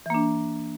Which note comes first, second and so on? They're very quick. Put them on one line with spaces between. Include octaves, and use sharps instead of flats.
E3 A#3 D4